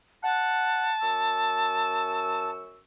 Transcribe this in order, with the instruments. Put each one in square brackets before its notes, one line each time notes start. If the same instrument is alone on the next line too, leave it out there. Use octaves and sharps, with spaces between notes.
[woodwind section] F#5 [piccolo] A5
[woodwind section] F#2 C#6 E6